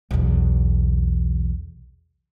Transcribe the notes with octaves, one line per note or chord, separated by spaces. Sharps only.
B1 E2